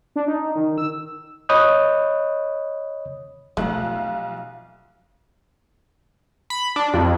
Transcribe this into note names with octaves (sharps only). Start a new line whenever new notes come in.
D4
D#4
D#3
E6
C#5 D#5 B5 D#6 F#6 G6
B1 C3 F3 A3 F4 F5 F#5 F#6
B5
D4
F2